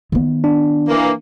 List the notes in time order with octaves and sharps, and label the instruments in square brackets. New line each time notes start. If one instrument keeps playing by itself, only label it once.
[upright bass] D#3 B3
[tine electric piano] D4
[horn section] E3 A#3